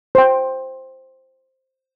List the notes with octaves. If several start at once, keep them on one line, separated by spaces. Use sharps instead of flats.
C5 G5